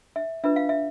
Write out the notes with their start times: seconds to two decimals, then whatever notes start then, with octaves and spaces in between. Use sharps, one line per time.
0.16 E5
0.44 D4 F4 B4 E5
0.56 F5
0.69 E5